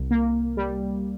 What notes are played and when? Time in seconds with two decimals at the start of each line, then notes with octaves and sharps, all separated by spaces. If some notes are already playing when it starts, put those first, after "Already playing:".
Already playing: C2
0.11 A#3
0.57 G3